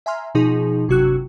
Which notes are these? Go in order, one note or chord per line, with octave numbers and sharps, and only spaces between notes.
E5 G#5 A#5 C6 F6
B2 F3 D#4 G#4
G1 C3 F#3 F#4 E6 F#6